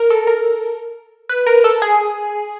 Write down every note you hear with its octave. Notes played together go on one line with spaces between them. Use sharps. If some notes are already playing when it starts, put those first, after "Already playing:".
Already playing: A#4
A4
A#4
B4
A#4
A4
G#4